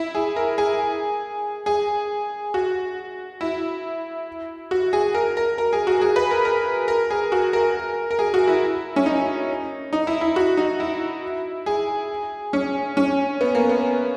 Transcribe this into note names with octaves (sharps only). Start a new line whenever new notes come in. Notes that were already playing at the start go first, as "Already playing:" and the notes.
Already playing: E4
G#4
A#4
G#4
G#4
F#4
E4
F#4
G#4
A#4
A#4
A#4
G#4
F#4
G#4
B4
A#4
A#4
A#4
G#4
F#4
A#4
A#4
G#4
F#4
E4
C#4
D#4
D#4
E4
E4
F#4
D#4
E4
G#4
C#4
C#4
B3
A#3
B3